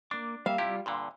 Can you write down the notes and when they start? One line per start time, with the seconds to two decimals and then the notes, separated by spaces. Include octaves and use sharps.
0.11 A#3 D4 D6
0.46 G3 A#3 E5 F5
0.58 C3 G3 E4 F4 G4
0.86 G2 A#2 D3 C6